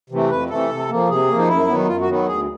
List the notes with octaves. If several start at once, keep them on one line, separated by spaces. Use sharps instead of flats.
C3 E3 A3
F2 B4
C3 E3 A3 A4
C3
F3 A#3
C3 G#4
F3 A#3
D#4
F#2 E4
D#3 F#3 B3
F#2 F4
F#4
D#3 F#3 B3
D2 G#4